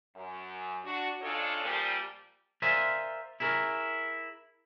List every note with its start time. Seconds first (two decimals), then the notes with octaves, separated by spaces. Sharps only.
0.16 F#2
0.85 D4 F#4
1.22 C#3 D4 D#4 F4 A4 C#5
1.64 A#2 F3 G3
2.62 A#4 C5 D5 E5 F5 G#5
3.40 E4 G#4 A#4 C#5